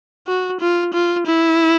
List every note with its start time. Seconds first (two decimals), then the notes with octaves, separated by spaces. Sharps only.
0.27 F#4
0.60 F4
0.94 F4
1.26 E4